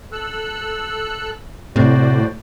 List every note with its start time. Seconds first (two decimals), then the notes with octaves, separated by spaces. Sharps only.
0.12 A4 E6 F#6
1.76 A2 C3 F#4 C5 D5